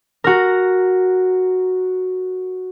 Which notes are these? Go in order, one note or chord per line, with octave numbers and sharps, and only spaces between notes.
F#4 A#4